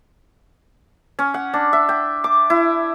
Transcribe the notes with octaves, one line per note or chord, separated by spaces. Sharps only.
C#4
F#5
D4
E5
G5
D6
E4